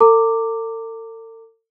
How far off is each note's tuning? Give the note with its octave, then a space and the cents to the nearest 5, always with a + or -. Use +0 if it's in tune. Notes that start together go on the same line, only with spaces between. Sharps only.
A4 +40 A#5 -30 D6 +0